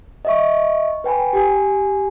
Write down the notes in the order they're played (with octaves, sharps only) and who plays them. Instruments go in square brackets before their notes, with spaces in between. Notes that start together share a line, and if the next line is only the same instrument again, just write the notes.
[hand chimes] D#5 E5 C#6
B4 G5 G#5 B5
G4 G#5